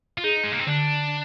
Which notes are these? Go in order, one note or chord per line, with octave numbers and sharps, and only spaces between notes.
F4
D#4 G#4
G#3
A#3
C4
D3 D4